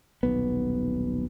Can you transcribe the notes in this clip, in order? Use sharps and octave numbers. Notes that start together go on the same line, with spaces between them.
D#1 B1 B3